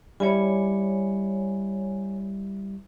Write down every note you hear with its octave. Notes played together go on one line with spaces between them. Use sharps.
G3 E4 C#5 G#5